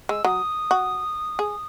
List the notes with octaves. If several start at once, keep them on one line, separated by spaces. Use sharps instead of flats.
G#3 E6
F#3 D#6
F#4
G#4